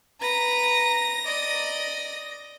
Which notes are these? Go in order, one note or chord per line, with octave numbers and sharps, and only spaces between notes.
B4 A#5 A#6
D5 D#5